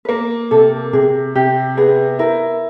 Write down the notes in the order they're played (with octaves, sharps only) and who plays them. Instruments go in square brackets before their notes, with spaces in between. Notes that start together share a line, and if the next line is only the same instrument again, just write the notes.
[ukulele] B4
[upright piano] A#3 [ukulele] A#4
[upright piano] C3 [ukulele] A4
[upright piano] C3 [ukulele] G#4
[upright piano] C3 [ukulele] G4
[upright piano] B3 [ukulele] G#4
[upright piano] E4 [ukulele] A#4